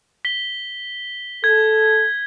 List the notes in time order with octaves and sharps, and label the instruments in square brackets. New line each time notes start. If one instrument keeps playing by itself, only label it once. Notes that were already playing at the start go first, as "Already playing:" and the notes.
[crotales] B6 G7
[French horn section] A4 [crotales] G#6